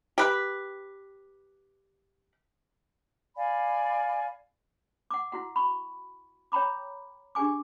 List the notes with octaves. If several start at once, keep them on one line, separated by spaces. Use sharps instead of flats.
G4 B4
D5 F5 G#5 B5
F#5 D6
E4 F#4 F#5
B5 C#6
C#5 G5 A#5 B5 D6
D4 G4 G#4 G#5 D6